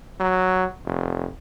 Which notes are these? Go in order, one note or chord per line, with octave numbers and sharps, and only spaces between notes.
F#3
F1